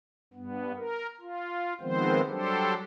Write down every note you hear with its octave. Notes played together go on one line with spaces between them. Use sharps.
G2 B3
A#4
F4
D#3 F3 G#3 B3 C4 C5
F#3 G3 D4 G4 A4 C5